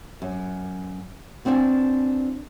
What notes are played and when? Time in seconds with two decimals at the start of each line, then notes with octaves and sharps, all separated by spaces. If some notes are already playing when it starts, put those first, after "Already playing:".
0.22 F#2
1.45 B3 C4 D4 F4 G#5